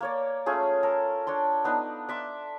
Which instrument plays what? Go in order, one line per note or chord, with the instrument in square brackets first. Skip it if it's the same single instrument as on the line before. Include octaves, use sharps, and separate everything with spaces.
[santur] A#3 C#5 D5
A3 C#4 F4 G#4
A4 A#4
D4 C#5 D5 C6
B3 D4 D#4
D5 E5 C6